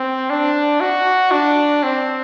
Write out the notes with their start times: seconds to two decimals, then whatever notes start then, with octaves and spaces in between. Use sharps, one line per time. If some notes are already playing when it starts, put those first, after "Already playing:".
Already playing: C4
0.30 D4
0.81 F#4
1.31 D4
1.83 C4